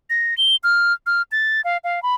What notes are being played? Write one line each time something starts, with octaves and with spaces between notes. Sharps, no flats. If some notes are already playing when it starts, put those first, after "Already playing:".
A#6
G7
F6
F6
A6
F5
F5
B5